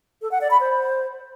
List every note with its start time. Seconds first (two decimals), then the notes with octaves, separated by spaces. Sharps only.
0.22 A4
0.31 F#5
0.41 D5
0.51 B5
0.60 C5